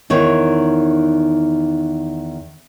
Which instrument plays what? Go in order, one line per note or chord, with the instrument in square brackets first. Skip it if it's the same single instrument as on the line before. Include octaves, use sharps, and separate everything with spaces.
[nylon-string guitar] E2 D#3 C#5